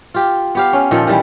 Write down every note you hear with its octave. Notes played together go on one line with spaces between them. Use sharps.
F4 G4
B3 G4 F5
C#4
A#2 D#3 F3 A4
D#3 E3 G3 E4